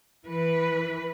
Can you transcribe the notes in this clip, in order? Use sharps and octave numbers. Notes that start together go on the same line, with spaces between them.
E3 B4